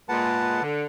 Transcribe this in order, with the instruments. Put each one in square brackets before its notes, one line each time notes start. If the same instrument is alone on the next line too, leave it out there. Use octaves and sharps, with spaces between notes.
[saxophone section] A#2 G#3 [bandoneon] B4 F#5 A5
[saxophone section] D3